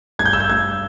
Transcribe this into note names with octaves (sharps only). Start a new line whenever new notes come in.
G2 G#6
G6
E6
G6
G2 G#6